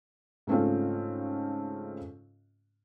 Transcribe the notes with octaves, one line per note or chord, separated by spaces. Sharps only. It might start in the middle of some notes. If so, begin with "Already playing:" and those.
G#2 C#3 A3 C4 C#4 F4